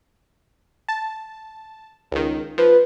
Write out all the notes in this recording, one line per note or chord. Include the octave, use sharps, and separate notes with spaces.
A5
C#2 D#3
F3 B4